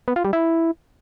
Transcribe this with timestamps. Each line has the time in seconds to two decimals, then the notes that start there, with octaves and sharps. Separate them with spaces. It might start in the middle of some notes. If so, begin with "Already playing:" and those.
0.08 B3
0.16 F4
0.25 G3
0.33 E4